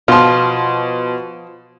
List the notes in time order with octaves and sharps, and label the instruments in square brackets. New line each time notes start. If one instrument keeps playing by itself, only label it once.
[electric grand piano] B2 C6 [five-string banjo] F3 F4